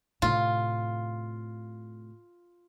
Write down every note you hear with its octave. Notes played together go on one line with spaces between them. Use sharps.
A2 C3 F4